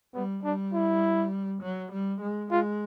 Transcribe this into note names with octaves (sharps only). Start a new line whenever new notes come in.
G3 B3
G3 D4
E4
F#3
G3
G#3
G#3 F4